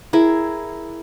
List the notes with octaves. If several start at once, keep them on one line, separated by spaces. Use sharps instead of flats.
E4 G#4 A#4